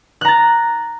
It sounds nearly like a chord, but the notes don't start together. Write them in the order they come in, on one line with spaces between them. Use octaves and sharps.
F#6 A#5 A6